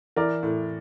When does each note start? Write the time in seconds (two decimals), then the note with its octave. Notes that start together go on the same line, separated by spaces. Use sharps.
0.16 E3 A#4 D5
0.43 A2